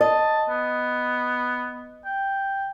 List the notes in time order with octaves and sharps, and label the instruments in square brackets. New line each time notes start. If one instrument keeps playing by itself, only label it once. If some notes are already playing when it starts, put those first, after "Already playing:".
[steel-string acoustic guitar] D#5 [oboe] A5
[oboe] B3
G5